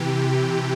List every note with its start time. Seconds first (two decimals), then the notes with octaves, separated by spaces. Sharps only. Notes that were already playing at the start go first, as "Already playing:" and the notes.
Already playing: C3 E3 G4